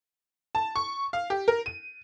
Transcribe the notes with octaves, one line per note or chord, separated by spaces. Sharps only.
A5
C#6
F5
G4
A#4
D#7